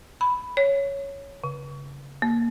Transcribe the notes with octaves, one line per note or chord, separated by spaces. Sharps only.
B5
C#5
C#3
A#3